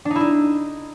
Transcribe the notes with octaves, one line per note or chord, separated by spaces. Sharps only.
D4
D#4
E4
D#4